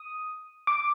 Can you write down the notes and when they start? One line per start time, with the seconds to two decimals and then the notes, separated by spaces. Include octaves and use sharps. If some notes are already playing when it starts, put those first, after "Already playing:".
Already playing: D#6
0.67 D6